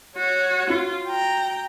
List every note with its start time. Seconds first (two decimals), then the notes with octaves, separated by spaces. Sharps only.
0.16 F#4 C#5
0.70 F4 F#4
1.08 G5 A#5